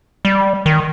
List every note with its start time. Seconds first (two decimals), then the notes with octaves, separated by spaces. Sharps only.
0.25 G3
0.66 D#3